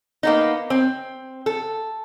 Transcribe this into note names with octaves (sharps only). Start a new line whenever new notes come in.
A#3 B3 D#4
C4
A4